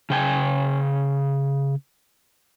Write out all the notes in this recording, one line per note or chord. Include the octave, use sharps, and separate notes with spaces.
C#3 G5 G#5